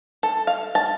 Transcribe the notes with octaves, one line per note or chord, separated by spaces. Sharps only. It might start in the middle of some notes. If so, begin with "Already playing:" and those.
A4
F5
A5